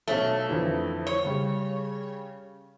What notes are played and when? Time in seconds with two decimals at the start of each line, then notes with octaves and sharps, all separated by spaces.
0.08 B1 A3 C#4 A5
0.49 F2 D3 E3
1.07 C#5
1.25 C#3 G3